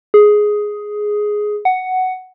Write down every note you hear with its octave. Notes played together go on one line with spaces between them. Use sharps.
G#4
F#5